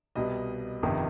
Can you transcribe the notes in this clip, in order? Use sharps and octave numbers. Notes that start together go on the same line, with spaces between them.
C2 B2 G3 D#5
G1 F2 C3 D#3